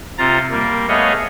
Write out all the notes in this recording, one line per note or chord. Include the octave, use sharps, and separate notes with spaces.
C3 F4 A#5 A6
G3 A#3
A3 B3 G#4 C#5 D#5 F5